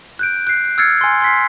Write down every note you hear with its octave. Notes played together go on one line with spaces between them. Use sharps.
F#6 G6 D7
F#6 C7
E6 F6 G#6 A6 C7 C#7
G#5 C6
C6 B6 C7